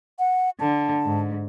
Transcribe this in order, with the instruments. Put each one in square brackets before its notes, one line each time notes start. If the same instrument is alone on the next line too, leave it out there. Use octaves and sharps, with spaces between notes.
[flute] F#5
[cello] D3 [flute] A5
[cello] G#2